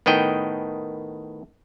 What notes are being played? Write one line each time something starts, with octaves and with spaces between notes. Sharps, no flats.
A2 D#3 B3 D#5 G5